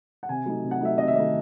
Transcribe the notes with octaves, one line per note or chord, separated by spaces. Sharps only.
F#5
C3 G#5
F#3 A3 D#4
C3
F#5
F#3 A3 D#4 E5
C3 D#5
E5
F#3 A3 D#4 D#5